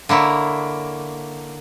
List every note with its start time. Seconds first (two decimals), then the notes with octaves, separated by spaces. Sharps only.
0.09 D3 A#3 E4 C#5